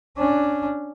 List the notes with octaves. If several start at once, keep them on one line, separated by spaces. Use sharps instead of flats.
C#4 D4